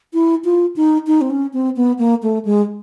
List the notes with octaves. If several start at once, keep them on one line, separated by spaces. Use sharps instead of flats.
E4
F4
D#4
D#4
C4
C#4
C4
B3
A#3
A3
G#3